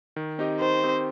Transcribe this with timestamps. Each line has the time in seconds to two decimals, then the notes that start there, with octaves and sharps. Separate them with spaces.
0.16 D#3
0.38 C4 D#4 G4 D#5
0.60 D#3 C5
0.83 C4 D#4 G4 D#5